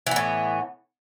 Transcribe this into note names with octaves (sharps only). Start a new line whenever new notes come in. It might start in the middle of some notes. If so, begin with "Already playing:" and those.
A2 E3 B3